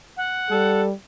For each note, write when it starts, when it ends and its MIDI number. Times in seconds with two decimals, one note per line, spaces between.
0.17 0.81 78
0.51 0.93 55
0.51 0.85 69